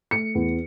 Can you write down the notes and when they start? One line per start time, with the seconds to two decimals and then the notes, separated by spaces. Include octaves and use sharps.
0.11 A3 C#7
0.35 E2